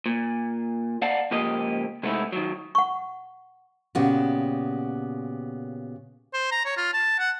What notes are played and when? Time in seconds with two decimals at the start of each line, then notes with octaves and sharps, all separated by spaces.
0.06 A#2
1.02 D5 F5 F#5 A5
1.31 C#2 F3 A#3 G4 D#5
2.03 C3 G#3 A3 B3 D#4 E4
2.32 D#3 F#3
2.75 F#5 C#6
3.95 A#2 C#3 B3 F#4 G4
6.34 C5
6.51 A#5
6.65 C#5
6.77 F4
6.94 A5
7.19 F#5